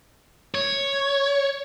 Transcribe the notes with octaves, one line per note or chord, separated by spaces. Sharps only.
C#5